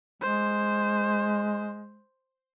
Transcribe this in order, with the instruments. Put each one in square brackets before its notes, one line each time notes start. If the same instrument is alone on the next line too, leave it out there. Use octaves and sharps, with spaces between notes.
[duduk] G#3 [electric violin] C5